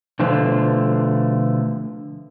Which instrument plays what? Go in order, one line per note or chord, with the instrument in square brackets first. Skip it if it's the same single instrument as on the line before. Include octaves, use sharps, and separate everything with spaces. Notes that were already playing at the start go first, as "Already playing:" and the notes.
[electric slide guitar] B2 D3 F3 A3 C5